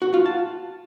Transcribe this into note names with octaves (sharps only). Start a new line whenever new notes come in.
F#4
F4
A5